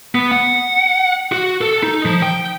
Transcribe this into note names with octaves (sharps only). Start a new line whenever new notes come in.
B3
F#5
F#4
A4
D#4
F3
G5